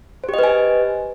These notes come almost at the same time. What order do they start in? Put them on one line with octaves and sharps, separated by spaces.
C5 G4 D#5 B4 G#5